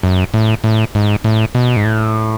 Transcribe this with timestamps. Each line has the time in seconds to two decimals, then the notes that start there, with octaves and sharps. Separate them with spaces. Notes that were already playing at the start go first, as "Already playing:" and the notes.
0.03 F#2
0.34 A2
0.64 A2
0.95 G#2
1.24 A2
1.55 B2
1.76 G#2
1.85 A2